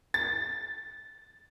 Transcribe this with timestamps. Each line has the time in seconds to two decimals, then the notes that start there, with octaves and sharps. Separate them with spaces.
0.14 A6